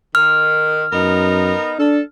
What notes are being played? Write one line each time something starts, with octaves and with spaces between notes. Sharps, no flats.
D#3 F6
F#2 B3 D#4 A#4
D4 A4